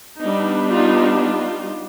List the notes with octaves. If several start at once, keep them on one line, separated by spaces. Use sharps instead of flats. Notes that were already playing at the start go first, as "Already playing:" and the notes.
G3 B3 D4 D#4
D#4 F4
D#4 F4